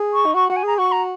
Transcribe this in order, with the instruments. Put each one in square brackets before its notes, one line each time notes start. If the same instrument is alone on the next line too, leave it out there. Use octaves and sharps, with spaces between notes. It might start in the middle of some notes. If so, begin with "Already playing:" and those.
Already playing: [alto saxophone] G#4
[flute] C#6
[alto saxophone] D#4
[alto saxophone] F#4 [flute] C#6
[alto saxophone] F#4 [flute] F#5
[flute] G#5
[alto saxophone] G#4 [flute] A#5
[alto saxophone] F#4 [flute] C#6
[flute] A#5